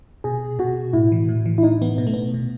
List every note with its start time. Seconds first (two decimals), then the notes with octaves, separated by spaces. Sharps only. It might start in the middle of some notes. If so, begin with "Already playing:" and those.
0.24 B2 G#4
0.59 B2 F#4
0.93 A2 E4
1.12 E3
1.29 A2
1.46 E3
1.58 E4
1.63 A2 D#4
1.82 E3 B3
1.98 B2 B3
2.07 A3
2.14 B3
2.34 B2